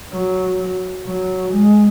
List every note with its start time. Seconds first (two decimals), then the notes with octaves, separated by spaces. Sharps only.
0.12 F#3
1.06 F#3
1.53 G#3